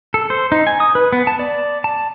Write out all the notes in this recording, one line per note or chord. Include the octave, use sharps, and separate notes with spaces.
A4
C5
D#4
G#5
D#6
B4
B3
A5
D5
A5